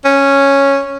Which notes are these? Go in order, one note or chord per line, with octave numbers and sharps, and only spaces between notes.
C#4